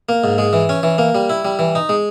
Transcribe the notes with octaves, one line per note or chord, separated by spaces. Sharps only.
A#3
G#2
G#3
E3
C#4
E3
A#3
G3
E4
G3
E3
D#4
G#3